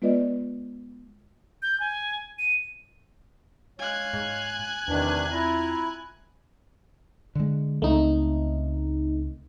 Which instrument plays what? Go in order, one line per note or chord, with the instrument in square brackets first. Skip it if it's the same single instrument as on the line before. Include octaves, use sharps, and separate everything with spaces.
[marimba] G#3 B3 F4 B4 D5 D#5
[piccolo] G6
G#5
D#7
[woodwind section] G#3 C#5 F5 [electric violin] G#5 F#6
[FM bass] G#2
[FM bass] E2 [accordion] C3 D#3 D4 [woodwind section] F3 A3 B4
[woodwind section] C4 F4 A#5 [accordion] E4
[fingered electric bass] D3 G#3
[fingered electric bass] C#2 C#3 C4 [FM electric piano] A3 D#4